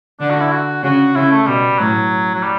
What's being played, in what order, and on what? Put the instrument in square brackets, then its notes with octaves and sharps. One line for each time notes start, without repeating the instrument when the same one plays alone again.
[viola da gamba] D3 [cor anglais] D4
[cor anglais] F#4
E4
F#4
[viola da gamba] C#3 [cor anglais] F#4
[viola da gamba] C#3 [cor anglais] E4
[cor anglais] A3
[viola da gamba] B2 [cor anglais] G3
[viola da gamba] A2 [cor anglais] F#3
[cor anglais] F#3
G3